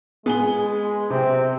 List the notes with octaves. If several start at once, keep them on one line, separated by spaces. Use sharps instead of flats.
G#3 B3 G#4 G7
C3 C4